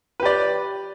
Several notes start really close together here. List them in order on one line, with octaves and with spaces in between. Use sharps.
B4 G4 D5